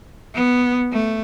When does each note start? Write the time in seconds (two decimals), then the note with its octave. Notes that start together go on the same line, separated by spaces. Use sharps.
0.35 B3
0.92 A3